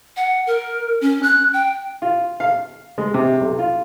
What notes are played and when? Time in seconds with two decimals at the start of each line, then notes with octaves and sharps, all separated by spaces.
0.16 F#5
0.47 A#4
1.01 C#4
1.23 F#6
1.54 G5
2.02 F4
2.40 F5
2.98 G#3
3.14 C3
3.41 B1
3.59 F4